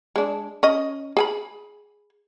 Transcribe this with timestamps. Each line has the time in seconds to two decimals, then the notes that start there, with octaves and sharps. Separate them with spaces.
0.16 G#3 D4
0.63 C#4 D#5
1.17 G#4 G#5 B5